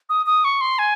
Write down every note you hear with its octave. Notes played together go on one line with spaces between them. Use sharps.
D#6
D#6
C#6
C6
G#5